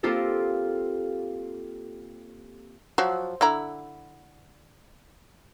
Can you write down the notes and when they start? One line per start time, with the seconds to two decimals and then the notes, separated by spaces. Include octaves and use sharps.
0.03 A#3 C4 F4 G4 A4 A#4
2.98 F3 F#3
3.41 D3 E4 A#5